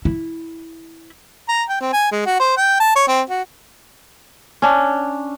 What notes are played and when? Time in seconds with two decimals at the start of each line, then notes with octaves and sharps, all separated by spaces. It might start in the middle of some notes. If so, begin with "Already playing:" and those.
0.05 E4
1.49 A#5
1.69 G5
1.81 C4
1.93 G#5
2.12 G#3
2.26 F#4
2.40 C5
2.57 G5
2.80 A5
2.96 C#5
3.08 C4
3.29 F#4
4.62 C#4 D4